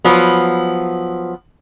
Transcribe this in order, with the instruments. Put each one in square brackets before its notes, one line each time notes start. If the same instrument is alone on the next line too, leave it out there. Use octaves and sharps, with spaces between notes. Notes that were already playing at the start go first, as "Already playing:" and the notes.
[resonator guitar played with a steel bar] F3 F#3 B3